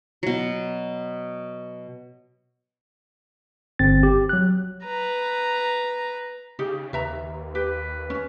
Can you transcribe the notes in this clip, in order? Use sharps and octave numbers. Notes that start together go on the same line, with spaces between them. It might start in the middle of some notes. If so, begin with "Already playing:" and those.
B2 F#3
G1 C4 A6
G4
F#3 F#6
B4 A#5
C#3 D#4 G4
D#2 B4 E5 A#5
G4 B4
C#4